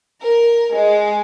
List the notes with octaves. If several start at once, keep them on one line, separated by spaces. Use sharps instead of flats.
A#4
G#3